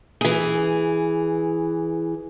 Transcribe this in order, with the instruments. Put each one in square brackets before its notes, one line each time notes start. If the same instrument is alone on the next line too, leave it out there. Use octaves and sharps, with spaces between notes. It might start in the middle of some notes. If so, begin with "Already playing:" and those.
[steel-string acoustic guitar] E3 G#4